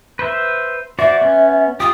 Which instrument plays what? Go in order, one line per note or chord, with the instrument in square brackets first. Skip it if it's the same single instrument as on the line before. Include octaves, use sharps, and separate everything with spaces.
[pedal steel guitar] B4 C5 E5
[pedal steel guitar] F#4 C5 D5 [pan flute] E5
[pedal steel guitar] B3 C#4
[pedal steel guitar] F4 G4 [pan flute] D#6